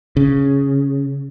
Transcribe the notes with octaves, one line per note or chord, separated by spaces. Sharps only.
C#3